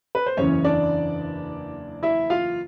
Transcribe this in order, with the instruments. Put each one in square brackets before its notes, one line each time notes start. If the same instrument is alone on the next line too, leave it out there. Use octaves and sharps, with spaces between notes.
[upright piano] B4
C5
F#1 E2 C#3 E3 C#4 C#5
D4 D5
E4 E5
F4 F5